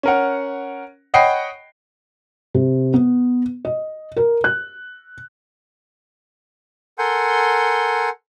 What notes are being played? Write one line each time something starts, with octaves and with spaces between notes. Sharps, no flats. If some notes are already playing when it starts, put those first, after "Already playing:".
C#4 A#4 F#5
C#5 D#5 F#5 G5 B5 C7
C3
B3
D#5
A#4
F#6
A4 A#4 F#5 G#5 C6 G6